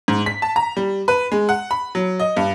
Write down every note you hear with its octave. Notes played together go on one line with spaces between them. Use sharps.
G#2
B6
A5
A#5
G3
B4
G#3
F#5
B5
F#3
D#5
G2